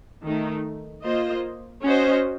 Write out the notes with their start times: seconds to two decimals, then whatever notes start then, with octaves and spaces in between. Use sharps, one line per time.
0.25 D#3 A3 D#4
1.04 A#3 F4 C5 D#5
1.84 C#4 F#4 C5 D#5